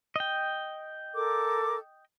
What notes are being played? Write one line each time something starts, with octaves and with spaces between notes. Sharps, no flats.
D#5 G5
A4 A#4 D6